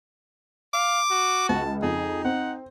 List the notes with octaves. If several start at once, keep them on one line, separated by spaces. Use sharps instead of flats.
F5 D6
F#4
C#2 A5
F2 D#4 G#4
C4 F#5